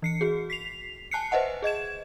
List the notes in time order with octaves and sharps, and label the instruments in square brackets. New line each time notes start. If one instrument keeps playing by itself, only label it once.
[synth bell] E3 C7 C#7
F#4 G#4
B6 C7 F7
G#5 A5 F#6 C7 C#7
B4 C5 D#5 E5 F#5 A5
G#4 D#5 G#6 E7